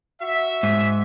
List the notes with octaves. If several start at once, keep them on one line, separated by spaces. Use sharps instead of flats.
F#4 E5
G#2